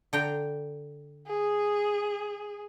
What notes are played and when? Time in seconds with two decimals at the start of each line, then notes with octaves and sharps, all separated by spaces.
0.13 D3 G5 A#5
1.27 G#4